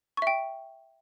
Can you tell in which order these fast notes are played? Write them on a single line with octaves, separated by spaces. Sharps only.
C#6 E5 G5